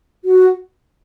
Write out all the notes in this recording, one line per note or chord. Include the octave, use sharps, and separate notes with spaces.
F#4